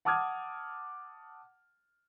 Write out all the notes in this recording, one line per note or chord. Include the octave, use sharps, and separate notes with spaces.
F#5 A5 D6 D#6 F6 G#6